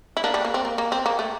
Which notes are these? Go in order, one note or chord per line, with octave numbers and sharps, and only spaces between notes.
E4
A#3 D4
G3
A#3
C4
A#3
A#3
C4
A#3
A3